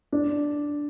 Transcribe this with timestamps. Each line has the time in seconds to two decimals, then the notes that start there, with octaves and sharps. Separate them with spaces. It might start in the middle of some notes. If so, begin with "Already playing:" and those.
0.12 D4